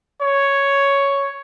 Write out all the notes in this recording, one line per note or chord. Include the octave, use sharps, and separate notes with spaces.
C#5